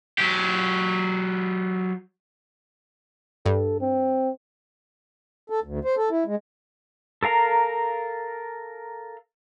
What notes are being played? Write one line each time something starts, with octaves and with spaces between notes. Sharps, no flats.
F#3 G4
G2 A4
C4
A4
D2
C5
A4
E4
G#3
A4 A#4 F5 A#5